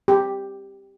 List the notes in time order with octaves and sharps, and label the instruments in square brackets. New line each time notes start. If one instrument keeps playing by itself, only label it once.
[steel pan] G4